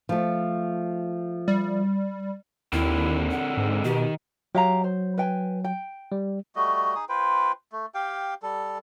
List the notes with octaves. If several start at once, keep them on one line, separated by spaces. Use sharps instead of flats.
F3 A3
G3
D#2 D3 C4 E4 A#4
F#5
G#2
B2 D#3 G4
F#3 G4 F5 A#5
C5
B4 G5 G#5
G5
G3
G3 A3 F#4 D#5
D#4 G#4 D#6
F4 B4 C5 G5
A3
G4 F5 G5
G3 A4